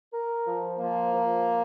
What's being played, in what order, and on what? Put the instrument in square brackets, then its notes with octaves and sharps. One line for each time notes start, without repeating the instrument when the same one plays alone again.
[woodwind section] A#4
F3
[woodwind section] F3 [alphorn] A#3
[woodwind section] F3